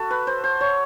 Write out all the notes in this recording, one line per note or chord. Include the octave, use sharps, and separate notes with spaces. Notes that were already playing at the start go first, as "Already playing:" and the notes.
Already playing: F#4 A4
B4
C5
C5
C#5